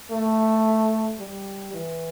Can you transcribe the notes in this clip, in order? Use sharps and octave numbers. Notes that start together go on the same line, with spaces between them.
A3
G3
E3